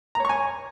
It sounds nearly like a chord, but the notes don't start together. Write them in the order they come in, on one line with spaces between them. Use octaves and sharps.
A#5 C#5 C#6 G#5